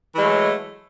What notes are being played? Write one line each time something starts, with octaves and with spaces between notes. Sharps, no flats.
E3 F#3 G#3 A3